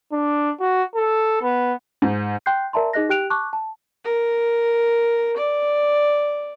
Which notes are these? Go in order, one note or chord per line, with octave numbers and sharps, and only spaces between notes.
D4
F#4
A4
B3
G#2
G5 C6 F#6 G6 C7
A#4 D5 E5 A5 A#5 C6
D#4 G#4 D#5 F#6 A#6
G4 G5 F#6 D7 F7
A5 C#6 D6 F#6
A5
A#4
D5